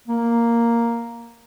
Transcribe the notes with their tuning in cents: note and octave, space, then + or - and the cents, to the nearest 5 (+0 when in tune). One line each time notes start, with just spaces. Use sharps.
A#3 +0